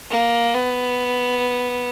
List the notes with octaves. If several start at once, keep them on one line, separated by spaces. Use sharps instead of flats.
A#3
B3